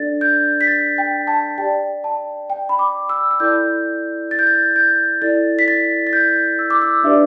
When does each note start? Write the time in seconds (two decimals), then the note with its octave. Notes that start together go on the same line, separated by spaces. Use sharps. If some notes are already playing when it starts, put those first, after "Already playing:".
Already playing: D4 A4 D5 A6
0.21 G6
0.61 B6
0.67 A6
0.98 G5
1.27 A5
1.58 G4 D5 G5
2.04 A5
2.50 G5
2.69 B5
2.79 D6
3.09 E6
3.31 E6
3.40 E4 A4 D5 G6
4.31 A6
4.39 G6
4.47 A6
4.76 G6
5.22 E4 A4 D5 A6
5.59 B6
5.68 A6
6.07 A6
6.13 G6
6.59 E6
6.70 D6
6.82 E6
7.03 D4 G4 B4 D5 E5